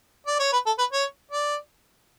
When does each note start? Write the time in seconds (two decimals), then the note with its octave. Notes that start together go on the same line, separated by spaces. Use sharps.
0.27 D5
0.39 C#5
0.53 B4
0.66 A4
0.78 B4
0.92 C#5
1.31 D5